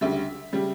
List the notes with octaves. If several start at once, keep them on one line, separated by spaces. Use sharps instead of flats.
D2 C#3 G3 E5
C#3 G3